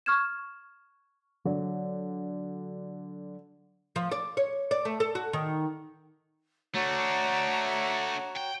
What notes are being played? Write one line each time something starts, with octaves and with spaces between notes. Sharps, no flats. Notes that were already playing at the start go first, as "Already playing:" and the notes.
C#6 F6 G#6 E7
D3 F#3
F3
D5
C#5
D5
A3
A4
F#4
D#3
A3 D4 F#4 C#5 A#5
G5